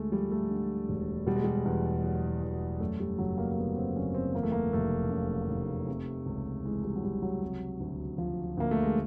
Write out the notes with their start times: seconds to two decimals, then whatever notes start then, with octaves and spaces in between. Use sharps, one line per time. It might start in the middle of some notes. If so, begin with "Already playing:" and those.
Already playing: D2 G#3 A3
0.11 F3 G3
0.31 A3
0.50 D3
0.89 E1
1.26 B2 G3
1.36 G#3
1.44 G3
1.65 E2
2.04 F#3
2.42 E2
2.80 F#2 A3
3.00 G3
3.18 F#1 F#3
3.38 A#3
3.51 A#3
3.58 D3 B3
3.76 C4
3.96 F#1 C#4
4.15 C4
4.35 E2 A#3
4.43 A3
4.52 A#3
4.73 F1 A3
5.11 C#3
5.50 F1
5.88 C3
6.26 C#2
6.65 E3 G#3
6.84 G3
6.96 F#3
7.03 C#2 G3
7.22 F#3
7.42 C3
7.80 D2
8.18 F3
8.57 D2 A#3
8.71 A3
8.83 G#3